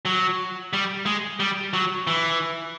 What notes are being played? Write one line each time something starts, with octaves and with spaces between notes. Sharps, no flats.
F#3
G3
G#3
G3
F#3
E3